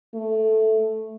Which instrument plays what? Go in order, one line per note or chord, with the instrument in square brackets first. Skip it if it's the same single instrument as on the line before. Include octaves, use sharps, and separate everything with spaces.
[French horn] A3